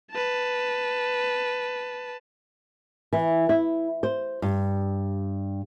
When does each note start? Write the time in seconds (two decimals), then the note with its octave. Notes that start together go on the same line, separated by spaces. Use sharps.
0.12 B4 A5
3.13 E3
3.49 E4
4.03 C5
4.42 G2